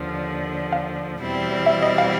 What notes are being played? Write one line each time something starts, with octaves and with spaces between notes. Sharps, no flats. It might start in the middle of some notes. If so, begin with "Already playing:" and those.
Already playing: D#2 D3 F3
F5
E2 B2 G3 C4 E4
E5
D#5
F5